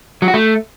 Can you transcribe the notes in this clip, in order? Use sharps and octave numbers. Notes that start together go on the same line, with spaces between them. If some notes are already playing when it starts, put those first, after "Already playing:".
F#3
F#4
A3